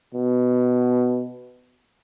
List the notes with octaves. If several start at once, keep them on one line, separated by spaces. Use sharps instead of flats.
B2